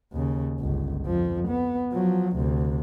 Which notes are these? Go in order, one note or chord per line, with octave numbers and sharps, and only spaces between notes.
D#2 C#3
G1 C#2
F2 F3
B3
F3 F#3
D2 C3